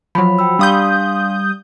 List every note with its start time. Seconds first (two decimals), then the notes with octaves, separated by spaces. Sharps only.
0.15 F3 F#3 B5
0.39 G5 B5 E6
0.59 G3 D4 F5 C6 D#6 G6